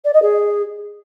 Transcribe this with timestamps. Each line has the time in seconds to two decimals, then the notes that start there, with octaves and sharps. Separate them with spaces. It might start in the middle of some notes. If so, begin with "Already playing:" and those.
0.04 D5
0.13 D#5
0.22 G#4